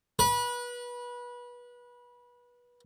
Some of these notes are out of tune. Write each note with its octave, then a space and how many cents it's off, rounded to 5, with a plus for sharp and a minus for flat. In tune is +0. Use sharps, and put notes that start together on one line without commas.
B4 -25